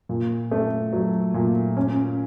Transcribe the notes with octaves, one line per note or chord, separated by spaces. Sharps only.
A#2
A3
F#3
A#2
C#4